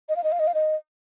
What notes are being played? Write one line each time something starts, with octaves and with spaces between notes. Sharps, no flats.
D#5
F5
D#5
F5
D#5
F5
D#5